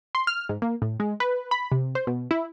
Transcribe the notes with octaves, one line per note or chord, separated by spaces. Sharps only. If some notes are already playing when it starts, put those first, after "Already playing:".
C6
F6
G#2
A#3
A2
G#3
B4
B5
C3
C5
B2
E4